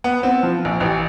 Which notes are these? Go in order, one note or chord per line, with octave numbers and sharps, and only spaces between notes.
B3
C4
F3
A#1
A1